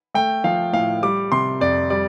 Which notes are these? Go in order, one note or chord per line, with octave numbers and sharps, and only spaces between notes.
A3 G5
F3 F5
A2 F5
G3 D6
C3 C6
F2 D5
G3 D5